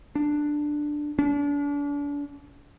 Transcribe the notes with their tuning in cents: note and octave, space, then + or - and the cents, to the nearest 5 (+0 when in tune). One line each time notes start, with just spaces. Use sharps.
D4 +10
D4 -35